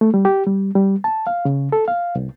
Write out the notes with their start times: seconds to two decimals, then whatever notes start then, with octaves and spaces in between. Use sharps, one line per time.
0.01 A3
0.14 G3
0.25 G4
0.47 G3
0.76 G3
1.04 A5
1.27 F5
1.45 C#3
1.72 A4
1.88 F5
2.15 C2